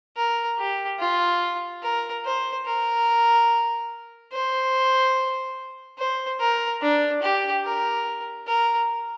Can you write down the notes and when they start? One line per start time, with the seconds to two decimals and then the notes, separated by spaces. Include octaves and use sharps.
0.17 A#4
0.58 G4
0.99 F4
1.83 A#4
2.25 C5
2.66 A#4
4.32 C5
5.99 C5
6.40 A#4
6.82 D4
7.22 G4
7.64 A#4
8.47 A#4